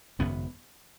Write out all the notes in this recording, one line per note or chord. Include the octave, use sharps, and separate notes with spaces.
G#1 F#2 C#3 B3